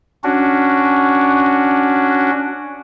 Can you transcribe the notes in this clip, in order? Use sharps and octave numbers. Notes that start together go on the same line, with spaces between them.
C#4 D4 F#4